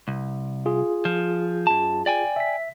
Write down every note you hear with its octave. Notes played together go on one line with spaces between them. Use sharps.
C2
F4 G#4
F3
F#2 A5
D5 G5 G#5
E5 B6